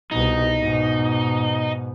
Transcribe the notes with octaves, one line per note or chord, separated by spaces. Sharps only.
C2 B2 D#4
G#2 B2